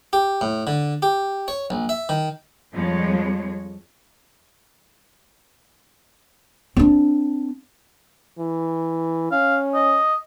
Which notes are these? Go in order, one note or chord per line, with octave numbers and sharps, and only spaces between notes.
G4
A2
D3
G4
C#5
A#1
E5
D#3
F2 F3 G3 G#3 C#5
C4 D4
E3
C#4 F5
D#5